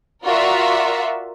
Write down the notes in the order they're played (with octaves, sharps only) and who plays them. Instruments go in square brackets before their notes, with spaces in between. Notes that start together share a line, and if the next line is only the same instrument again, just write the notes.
[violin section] F4 F#4 A#4 D5 E5